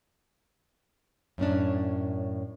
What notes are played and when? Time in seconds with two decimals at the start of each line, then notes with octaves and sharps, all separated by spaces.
1.38 F#2 A2 C#4 D4